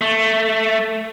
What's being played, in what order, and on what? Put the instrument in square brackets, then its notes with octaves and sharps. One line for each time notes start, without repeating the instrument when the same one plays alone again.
[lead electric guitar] A3